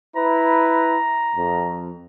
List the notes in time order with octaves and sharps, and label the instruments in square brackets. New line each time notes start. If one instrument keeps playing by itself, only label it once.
[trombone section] E4 B4 [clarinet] A#5
[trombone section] F2